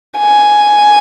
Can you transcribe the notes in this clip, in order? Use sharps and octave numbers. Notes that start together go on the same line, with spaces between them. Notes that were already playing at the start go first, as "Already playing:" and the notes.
G#5